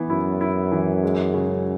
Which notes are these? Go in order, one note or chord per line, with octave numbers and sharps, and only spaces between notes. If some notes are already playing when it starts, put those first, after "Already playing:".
Already playing: E3 B3
F#2 E4
E4
E3
G#3
C#3